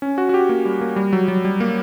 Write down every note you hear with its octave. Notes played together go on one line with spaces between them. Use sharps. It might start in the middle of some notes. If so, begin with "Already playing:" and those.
C#4
F#4
F#4
G4
A#3
G3
A#3
G3
F#3
F#3
G3
A#3